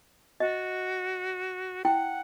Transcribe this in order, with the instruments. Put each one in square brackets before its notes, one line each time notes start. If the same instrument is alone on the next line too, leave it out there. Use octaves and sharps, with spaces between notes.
[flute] F#4 [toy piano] D#5
[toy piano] E4 G5 [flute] F#5